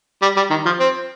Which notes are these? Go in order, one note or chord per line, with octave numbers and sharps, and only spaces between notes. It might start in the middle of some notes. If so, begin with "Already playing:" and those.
G3
G3
D#3
F3
C4